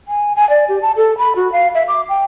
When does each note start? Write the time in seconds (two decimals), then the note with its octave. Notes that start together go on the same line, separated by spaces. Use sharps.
0.08 G#5
0.36 G#5
0.50 D5
0.69 G4
0.82 A5
0.96 A4
1.18 B5
1.36 F#4
1.52 F5
1.75 E5
1.88 D6
2.09 G5